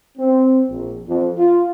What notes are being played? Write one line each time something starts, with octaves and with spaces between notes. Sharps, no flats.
C4
A#1
F2
F4